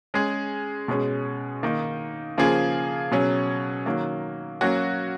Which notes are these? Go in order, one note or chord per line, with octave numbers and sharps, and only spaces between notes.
G#3 C#4 G#4
B2 G#3 C#4 G#4
D#3 A#3 D#4
C#3 F3 A#3 F4 G#4
B2 F#3 C#4 G#4
D#3 F#3 A#3
F#3 A#3 C#4 F#4